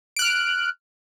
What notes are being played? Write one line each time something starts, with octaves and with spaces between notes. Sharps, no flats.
F6 F#6 D7